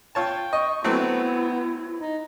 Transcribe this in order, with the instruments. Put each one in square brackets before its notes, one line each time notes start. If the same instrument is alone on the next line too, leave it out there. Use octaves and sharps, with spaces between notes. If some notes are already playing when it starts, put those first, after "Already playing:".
[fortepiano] F4 C#5 A5 [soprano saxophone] G5
[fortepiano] D#5 [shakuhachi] C#6
[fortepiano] F#3 A3 C4 [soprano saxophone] B3 [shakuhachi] E4
[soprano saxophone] D#4